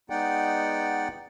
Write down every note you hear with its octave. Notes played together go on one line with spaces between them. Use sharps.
G#3 B3 D#4 D5 F#5 G5